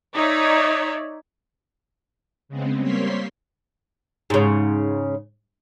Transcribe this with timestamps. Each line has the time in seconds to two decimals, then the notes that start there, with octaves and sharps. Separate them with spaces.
0.14 D#4 C#5 D5 E5
2.49 C#3 G#3 B3 C4
2.79 G3 A#3 C4 C#5 C6 B6
4.30 G#2 C#3